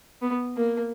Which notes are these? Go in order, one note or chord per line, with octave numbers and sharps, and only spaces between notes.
B3
A#3